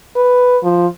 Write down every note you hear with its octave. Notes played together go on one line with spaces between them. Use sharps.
B4
F3